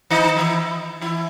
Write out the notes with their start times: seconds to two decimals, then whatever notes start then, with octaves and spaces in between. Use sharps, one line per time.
0.10 D#3 D#4
0.36 E3 E4
1.01 E3 E4